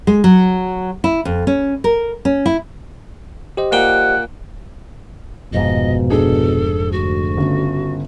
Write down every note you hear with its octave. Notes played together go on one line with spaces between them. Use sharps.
G#3
F#3
E4
F2
C#4
A#4
C#4
E4
G4 C5 D#5
A#2 F#5 G5
F1 F2 G#2 B2 D#5
D4 G#4 A4
D2 F#4
G1 C#3